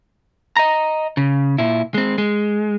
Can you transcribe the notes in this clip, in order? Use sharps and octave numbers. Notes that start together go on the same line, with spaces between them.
D#5 A#5
C#3
A#2 E4
G#3 C4
G#3